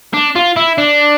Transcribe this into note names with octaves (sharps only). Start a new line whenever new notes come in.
D4
F4
E4
D4